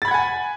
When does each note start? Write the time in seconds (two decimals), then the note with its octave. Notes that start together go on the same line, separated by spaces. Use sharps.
0.02 A6
0.05 B5
0.08 G#6
0.11 F#5
0.14 G#5